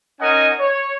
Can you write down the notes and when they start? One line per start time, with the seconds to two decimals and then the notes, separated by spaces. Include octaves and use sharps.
0.21 C#4 D#4 A#4 D#5 F#5 G#5
0.59 C#5